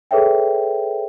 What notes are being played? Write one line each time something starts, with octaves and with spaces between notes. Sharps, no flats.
G#4 A4 B4 C#5 E5 G5